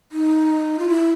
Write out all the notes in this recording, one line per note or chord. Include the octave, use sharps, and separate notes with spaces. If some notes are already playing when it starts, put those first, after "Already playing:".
D#4
F4
E4